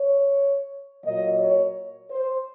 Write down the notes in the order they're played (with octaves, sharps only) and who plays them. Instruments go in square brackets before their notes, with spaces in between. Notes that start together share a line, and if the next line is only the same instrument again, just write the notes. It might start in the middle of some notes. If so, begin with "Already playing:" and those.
Already playing: [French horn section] C#5
A#2 F#3 A#3 D#5
C#5
C5